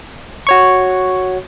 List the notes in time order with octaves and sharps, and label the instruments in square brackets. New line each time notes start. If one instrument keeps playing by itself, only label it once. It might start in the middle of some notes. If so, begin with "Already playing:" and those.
[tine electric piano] F#4 C#5 C#6